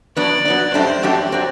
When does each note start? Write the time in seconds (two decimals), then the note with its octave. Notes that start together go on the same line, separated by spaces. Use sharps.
0.17 F#3 B3 D4 D5
0.45 F#3 B3 D4
0.74 F#2 F#3 A3 D4 G4 C5
1.03 F#2 F#3 A3 D4 G4 D5
1.32 F#3 C4